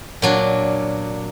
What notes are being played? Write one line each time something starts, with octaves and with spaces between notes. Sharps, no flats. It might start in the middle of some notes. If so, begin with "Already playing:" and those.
A#2 F#3 D4